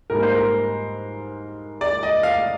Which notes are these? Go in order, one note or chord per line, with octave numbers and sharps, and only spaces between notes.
G#2 G3 A#3 A#4
C5
A#4
D5
D#5
F5